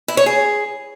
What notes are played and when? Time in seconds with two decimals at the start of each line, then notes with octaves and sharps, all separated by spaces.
0.08 E4
0.17 C#5
0.26 G#4